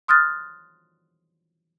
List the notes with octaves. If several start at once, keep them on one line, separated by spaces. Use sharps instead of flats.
C6 D#6 F6 F#6 A6